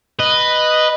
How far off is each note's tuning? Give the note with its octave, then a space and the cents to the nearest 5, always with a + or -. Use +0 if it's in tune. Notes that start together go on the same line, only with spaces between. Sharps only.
B4 +0 D#5 -5